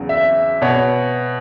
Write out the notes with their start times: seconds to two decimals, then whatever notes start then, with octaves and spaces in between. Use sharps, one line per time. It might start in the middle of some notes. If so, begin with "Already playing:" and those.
Already playing: E2 C#3 F#3
0.09 E5
0.62 B2 B3 C#5